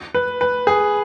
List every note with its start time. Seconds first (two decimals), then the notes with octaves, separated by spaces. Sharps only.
0.15 B4
0.41 B4
0.67 G#4